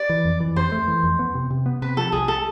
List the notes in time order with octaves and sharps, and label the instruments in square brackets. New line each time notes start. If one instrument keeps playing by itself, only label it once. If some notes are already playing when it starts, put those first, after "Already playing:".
Already playing: [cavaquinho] D5
[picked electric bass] E3
F2
E3
[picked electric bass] F2 [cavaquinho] C5
[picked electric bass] A3
E3
F2
B3
C3
C3
B3
[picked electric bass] C3 [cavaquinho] B4
[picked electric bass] F3 [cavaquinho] A4
[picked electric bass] C2 [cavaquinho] G#4
[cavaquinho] A4